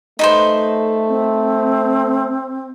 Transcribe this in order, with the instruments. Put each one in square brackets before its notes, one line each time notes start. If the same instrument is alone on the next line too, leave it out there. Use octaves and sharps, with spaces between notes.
[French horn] A3 [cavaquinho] D#4 B4 C5
[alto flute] C4